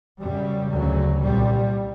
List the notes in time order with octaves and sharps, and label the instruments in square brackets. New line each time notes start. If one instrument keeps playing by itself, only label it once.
[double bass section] F#2 C#3 G3
D2 C#3 F#3
C2 A#2 G3